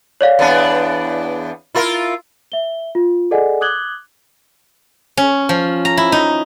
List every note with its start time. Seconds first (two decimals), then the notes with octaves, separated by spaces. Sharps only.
0.21 C#5 D5 F5
0.39 E2 B3 D4
1.75 E4 F4 A#4
2.52 E5 G7
2.95 F4
3.31 G#4 A4 D5 D#5 F#5 G#5
3.61 D6 D#6 F#6 G#6 F#7 G7
5.17 C#4
5.49 F3
5.85 A#5
5.97 E4
6.12 D#4